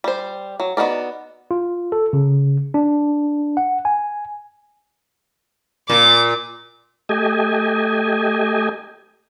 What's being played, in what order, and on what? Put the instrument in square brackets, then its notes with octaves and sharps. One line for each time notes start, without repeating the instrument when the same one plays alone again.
[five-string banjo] G3 C5
F#3
B3 D#4 F#4 A#4 D5
[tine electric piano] F4
A4
C#3
D4
F#5
G#5
[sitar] A#2 [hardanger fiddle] D6
[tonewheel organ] A3 G4 D#5 G#5